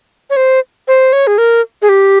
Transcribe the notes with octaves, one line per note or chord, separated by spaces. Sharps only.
C#5
C5
C5
C#5
G#4
A#4
G#4
G4